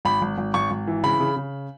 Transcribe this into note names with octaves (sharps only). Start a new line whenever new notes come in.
G#1 B5
G#1
G#1
G#1 C#6
G#1
E3
C#3 B5
C#3
C#3